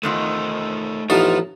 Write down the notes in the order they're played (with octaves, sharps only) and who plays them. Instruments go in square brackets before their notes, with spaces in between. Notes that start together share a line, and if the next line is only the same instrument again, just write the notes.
[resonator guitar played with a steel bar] E2 D#3 F3 [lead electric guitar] A3 D#4
[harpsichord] A1 B3 A5 [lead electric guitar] F3 [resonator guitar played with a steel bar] D#4